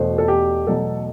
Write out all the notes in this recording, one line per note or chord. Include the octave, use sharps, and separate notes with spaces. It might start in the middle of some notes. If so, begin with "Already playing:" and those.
Already playing: E1 E2 B2 A3 C5
A4
G4
E2 B2 F#3 A3 A4